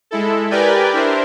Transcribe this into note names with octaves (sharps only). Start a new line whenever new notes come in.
G#3 E4 A4
G4 A#4 B4 D5 G5 G#5
D4 E4 A#4 C5